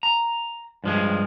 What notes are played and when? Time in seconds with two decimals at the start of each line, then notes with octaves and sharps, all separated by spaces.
0.03 A#5
0.84 G2 F3 G#3